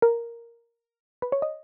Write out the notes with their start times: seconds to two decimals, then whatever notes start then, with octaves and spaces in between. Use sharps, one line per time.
0.02 A#4
1.22 B4
1.32 C#5
1.42 D#5